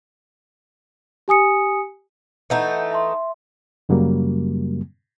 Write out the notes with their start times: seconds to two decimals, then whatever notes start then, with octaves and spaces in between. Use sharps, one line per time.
1.28 G4 G#5 D#6 C#7
2.50 E3 A3 D#4 F#5 G6
2.91 E5 A5 C6
3.89 F#2 C#3 F#3 G3 A#3